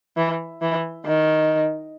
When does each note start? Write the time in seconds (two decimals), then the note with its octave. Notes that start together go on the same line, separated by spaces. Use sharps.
0.17 E3
0.62 E3
1.06 D#3